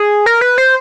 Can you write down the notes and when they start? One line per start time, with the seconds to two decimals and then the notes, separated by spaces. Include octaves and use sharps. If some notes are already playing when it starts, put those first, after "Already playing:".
Already playing: G#4
0.26 A#4
0.41 B4
0.58 C5